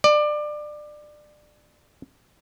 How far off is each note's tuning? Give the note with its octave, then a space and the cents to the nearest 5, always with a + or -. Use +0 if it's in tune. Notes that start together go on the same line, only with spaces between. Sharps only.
D5 +25